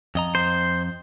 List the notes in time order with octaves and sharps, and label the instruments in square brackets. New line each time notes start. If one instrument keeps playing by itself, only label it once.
[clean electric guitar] F2 D#5 A#5
[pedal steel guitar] C5